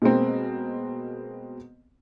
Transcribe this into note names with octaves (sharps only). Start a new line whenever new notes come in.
B2 G#3 A#3 C4